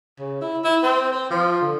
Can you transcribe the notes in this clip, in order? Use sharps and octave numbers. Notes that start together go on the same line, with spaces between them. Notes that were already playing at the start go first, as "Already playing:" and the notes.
C#3
E4
E4
C4
C4
F3
D3